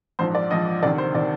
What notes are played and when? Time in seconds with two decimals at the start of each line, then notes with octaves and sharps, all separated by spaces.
0.19 A#1 G#2 F3 C5
0.35 D5
0.50 A#1 G#2 F3 D#5
0.82 D2 C3 D#3 D5
0.98 C5
1.14 C3 D#3 D5